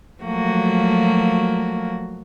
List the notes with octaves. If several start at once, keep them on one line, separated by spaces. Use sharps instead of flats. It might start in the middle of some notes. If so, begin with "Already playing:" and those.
F3 F#3 A3 A#3 F#4